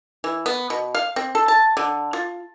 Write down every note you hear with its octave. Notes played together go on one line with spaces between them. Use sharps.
E3
B3
B2
F5
C4
A4
A5
D3
F4